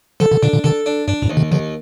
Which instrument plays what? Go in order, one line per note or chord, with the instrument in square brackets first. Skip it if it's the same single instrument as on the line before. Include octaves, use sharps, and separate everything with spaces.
[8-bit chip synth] D3 F3 [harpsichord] A4
[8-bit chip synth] C3 D#3
[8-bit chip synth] A#2 D3 [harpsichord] D4
[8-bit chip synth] A#2 D3
[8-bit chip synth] C3 D#3 [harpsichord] A4
[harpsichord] D4
[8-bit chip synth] G2 [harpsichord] D4
[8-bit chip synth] F2 A2
[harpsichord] D#2
[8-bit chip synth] C3 D#3
[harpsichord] D#2 [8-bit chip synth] D3 F3